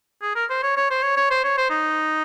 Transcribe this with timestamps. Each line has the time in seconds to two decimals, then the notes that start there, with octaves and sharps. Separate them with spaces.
0.22 G#4
0.36 A#4
0.50 C5
0.63 C#5
0.77 C#5
0.91 C5
1.03 C#5
1.17 C#5
1.31 C5
1.44 C#5
1.58 C5
1.70 D#4